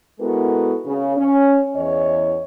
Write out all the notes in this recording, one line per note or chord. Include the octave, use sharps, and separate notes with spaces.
G#3 B3 E4 F#4 A4 A#4
C#3
C#4
E2 C#5 D#5